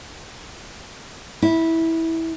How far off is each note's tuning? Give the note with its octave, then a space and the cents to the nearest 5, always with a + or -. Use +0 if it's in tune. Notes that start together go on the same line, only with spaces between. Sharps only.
E4 -15